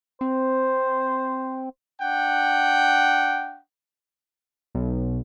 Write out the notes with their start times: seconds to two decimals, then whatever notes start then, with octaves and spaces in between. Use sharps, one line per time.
0.21 C4 C5
2.01 D4 F#5 G5
4.75 B1